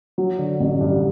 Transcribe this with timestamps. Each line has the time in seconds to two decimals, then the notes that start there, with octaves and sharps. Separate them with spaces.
0.18 F#3
0.39 D3
0.60 A1
0.81 G2